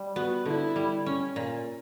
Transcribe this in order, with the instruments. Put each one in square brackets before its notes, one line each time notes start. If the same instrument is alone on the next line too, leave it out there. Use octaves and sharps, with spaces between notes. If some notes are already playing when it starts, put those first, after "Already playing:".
Already playing: [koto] G3
[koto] B3 [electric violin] F#4
[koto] D3 [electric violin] E4
[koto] G3
C#4
A#2